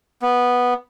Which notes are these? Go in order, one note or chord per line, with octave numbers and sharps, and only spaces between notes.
B3